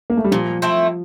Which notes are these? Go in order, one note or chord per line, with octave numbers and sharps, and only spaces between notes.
A#3
A3
G3
A#2 F3
A3 C4 E4